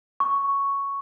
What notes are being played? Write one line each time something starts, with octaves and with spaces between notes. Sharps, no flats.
C#6